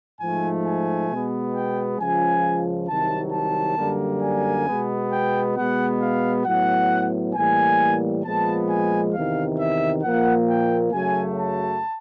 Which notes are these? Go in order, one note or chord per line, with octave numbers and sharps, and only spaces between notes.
G#2 F3 A3 G#5
G#5
B2 G#3 B3
G5
C#2 C#3 F3 G#5
C2 C3 D#3 F#3 A5
A5
F#2 D3 G3 A#3
G#5
B2 G#3 B3
G5
B2 G#3 B3 F#5
F5
A2 F#3 B3 F#5
A2 E3 G3 A#3 G#5
A#2 F3 G#3 B3 A5
G#5
E2 C3 D#3 F5
E5
A#2 F3 A#3 F#5
G5
F#2 C#3 F#3 A3 G#5
A5